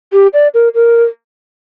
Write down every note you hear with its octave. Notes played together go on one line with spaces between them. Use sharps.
G4
D5
A#4
A#4